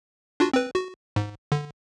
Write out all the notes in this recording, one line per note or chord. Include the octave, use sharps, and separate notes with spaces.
D4 F4 F#4
C4 B4
F#4
G#2
D3